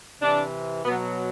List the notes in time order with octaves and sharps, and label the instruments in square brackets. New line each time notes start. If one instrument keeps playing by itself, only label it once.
[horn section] C3 E3 D4
B2 B3
F#3